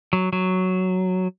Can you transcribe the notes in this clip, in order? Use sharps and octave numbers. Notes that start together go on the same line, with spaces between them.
F#3
F#3